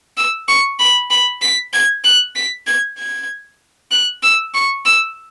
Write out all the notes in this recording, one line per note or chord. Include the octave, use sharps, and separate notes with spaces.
E6
C#6
B5
B5
B6
G#6
F#6
B6
G#6
G#6
F#6
E6
C#6
E6